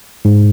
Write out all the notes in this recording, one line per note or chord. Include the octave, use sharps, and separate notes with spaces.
G#2